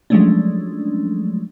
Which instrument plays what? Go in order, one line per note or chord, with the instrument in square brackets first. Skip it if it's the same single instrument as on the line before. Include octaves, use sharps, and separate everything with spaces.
[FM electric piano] F3 F#3 G#3 A3 C#4 D4